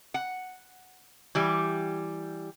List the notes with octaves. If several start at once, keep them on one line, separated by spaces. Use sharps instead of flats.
F#5
E3 G3 G4